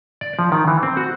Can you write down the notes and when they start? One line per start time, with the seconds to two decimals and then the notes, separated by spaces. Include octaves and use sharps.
0.21 D5
0.39 F3
0.52 D#3
0.68 E3
0.83 C4
0.97 F#4